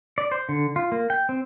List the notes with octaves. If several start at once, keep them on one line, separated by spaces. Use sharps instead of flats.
D5
C5
D3
F4
A#3
G5
C4